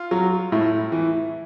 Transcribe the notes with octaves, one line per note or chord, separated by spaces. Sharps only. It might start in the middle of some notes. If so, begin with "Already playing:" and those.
Already playing: F4
F#3
A2 E4
E3